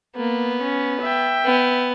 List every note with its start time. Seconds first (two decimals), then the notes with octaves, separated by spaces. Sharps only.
0.16 A#3 B3
0.63 C#4
1.02 E5 G5
1.45 B3